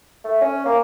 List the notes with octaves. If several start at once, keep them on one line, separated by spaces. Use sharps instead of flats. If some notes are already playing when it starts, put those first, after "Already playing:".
A3
C#4
A#3